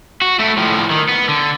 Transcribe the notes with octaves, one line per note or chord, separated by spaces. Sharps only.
F#4
A3 E4
A2 F3
D#3
B3
D3